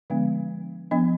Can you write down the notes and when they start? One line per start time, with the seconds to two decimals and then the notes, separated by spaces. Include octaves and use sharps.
0.10 D3 F3 G#3 B3 D4
0.91 F3 B3 D4 D#5